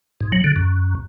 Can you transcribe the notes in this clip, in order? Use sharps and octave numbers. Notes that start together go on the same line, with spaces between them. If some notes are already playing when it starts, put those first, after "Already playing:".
G#2
F#3
D3
F#2